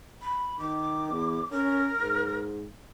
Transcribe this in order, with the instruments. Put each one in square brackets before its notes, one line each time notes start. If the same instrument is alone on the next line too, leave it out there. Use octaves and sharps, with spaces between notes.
[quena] B5
[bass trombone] D#3 [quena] D6
[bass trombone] E2
[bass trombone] C#4 [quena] A#4
[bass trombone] G#2